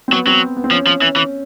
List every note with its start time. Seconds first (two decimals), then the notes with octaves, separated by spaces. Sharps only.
0.08 C4
0.12 F#3 B3
0.27 F#3 C4
0.57 B3
0.64 C4
0.71 F3 C#4
0.87 F3
1.02 E3
1.16 E3